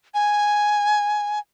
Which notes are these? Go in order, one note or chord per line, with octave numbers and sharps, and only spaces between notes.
G#5